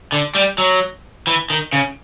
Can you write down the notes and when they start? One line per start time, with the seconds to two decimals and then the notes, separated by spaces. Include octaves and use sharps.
0.12 D3
0.35 G3
0.58 F#3
1.27 E3
1.50 D#3
1.73 C#3